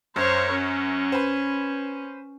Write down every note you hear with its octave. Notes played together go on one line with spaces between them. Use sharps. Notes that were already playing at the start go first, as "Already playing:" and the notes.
F#2 C5 C#5
C#4
B4 C5